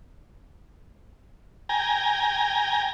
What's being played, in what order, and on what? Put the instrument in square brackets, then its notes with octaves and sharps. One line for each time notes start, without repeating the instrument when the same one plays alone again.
[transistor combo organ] G5 G#5 A#5